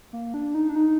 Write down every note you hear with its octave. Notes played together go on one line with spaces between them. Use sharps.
A#3
D4
D#4
D4
D#4